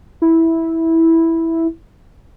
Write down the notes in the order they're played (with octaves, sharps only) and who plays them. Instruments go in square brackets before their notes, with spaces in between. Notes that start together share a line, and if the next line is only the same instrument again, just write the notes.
[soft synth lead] E4